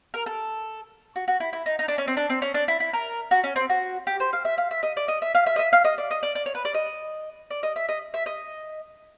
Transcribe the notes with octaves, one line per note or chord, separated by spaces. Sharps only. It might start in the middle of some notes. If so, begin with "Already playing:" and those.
A#4
A4
F#4
F#4
E4
E4
D#4
D#4
D4
C#4
C4
D4
C4
C#4
D4
E4
E4
A#4
F#4
C#4
C4
F#4
G4
C5
F5
E5
F5
E5
D#5
D5
D#5
E5
F5
E5
D#5
E5
F5
D#5
D5
D#5
D5
D5
C#5
B4
D5
D#5
D5
D#5
E5
D#5
E5
D#5